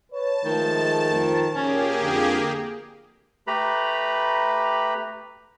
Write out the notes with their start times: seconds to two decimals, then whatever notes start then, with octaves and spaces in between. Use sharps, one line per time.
0.12 B4 C#5 A5
0.45 D#3 F3 G#3 A3
1.12 F2 F3
1.54 A#2 A#3 C#4 G4 G#4
2.01 F2 D3
3.47 A3 G4 B4 A#5 B5